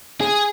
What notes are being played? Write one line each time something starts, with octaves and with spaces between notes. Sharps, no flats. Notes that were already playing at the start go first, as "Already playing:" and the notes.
G#4